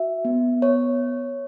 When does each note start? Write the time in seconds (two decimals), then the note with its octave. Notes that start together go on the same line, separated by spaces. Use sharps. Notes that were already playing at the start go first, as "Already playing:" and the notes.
Already playing: F#4 E5
0.25 B3
0.62 C#5